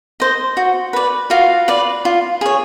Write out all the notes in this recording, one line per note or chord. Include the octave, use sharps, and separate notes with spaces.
C5 D#5
F#4
B4 D5
F4 F#4 F5
B4 D5
F4
G#4 C#5